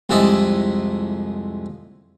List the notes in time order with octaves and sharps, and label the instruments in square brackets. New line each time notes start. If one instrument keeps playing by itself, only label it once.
[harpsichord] C2 F2 G#3 E4 D5 D#5